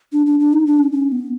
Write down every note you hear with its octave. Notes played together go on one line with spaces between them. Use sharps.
D4
D4
D4
D#4
D4
C#4
C#4
B3